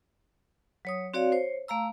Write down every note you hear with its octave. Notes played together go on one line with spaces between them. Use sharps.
F#3 C#5 D#6
C4 F#4 C#5 D5 F5
C5 C#5
A3 F5 A#5 E6